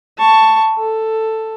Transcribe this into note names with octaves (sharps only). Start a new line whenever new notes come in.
A5 C#6
A4